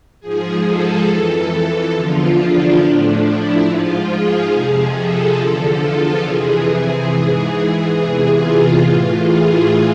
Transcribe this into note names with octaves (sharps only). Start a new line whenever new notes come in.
G#2 F3 G#4
A4
F2 E3 A4
E2 D3 F3 F4
D4
A2 F3
E4
G#2 F3 F4
G#4
F2 C3 F3 G#4
A4
E2 D3 F3
F4
F2 C3 E3 G#4
G#4
G#2 E3
E2 C3 E3 G#4
F4
A2 E3 F4
G#4